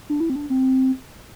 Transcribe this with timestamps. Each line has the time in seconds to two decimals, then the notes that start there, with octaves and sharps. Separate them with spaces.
0.10 D4
0.20 E4
0.30 C4
0.36 D4
0.50 C4